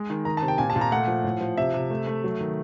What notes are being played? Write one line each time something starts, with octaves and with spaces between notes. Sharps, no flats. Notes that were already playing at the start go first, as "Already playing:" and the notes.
Already playing: G#3
D#3
D#3 A#5
A5
C3
G5
A#2 G#5
A5
A#2
A#5
A3 F#5
F3
A2
F3
C3 E5
C3
A3
A3
F#3
D#3